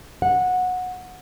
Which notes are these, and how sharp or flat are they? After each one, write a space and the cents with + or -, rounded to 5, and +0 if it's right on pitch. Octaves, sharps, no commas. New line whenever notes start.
F#5 -15